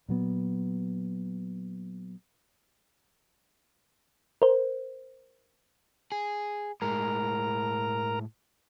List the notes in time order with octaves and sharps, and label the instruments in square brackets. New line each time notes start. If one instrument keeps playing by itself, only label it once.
[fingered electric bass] A#2 F#3 B3
[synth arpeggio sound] A#4 C5
[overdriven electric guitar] G#4
[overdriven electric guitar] A2 G#3 [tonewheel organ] A#4 A#5